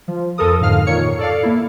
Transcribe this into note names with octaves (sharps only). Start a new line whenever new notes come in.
F3
F2 F3 A4 A#4 D#6
F2 G#2 D3 F5 F6
A#2 D#3 C#5 C#7
A4 D5 F5
A#3 E4